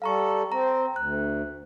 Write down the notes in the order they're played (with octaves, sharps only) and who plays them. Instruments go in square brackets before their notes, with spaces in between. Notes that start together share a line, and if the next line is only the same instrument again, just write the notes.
[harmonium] G3 A4 [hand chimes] F5 A#5 C#6
[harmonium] C4 [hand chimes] A#5
[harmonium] D2 [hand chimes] F#6